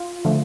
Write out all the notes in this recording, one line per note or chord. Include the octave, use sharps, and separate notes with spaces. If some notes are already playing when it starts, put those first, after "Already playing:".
Already playing: F4
D3 F3 A3